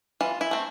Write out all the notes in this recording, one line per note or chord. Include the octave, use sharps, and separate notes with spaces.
E3 F4
E4
A3 C4